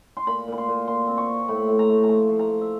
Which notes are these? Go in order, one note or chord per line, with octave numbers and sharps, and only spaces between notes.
C6
A#2 B5
A#2 B5
C6
A#2
A#2 C6
C4
C#6
C4
A2 B5
A2
A#5
A3
A#5
F3 A5
F3
A#5
A3
E5